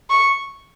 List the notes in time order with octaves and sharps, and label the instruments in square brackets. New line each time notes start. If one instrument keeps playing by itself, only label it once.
[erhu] C#6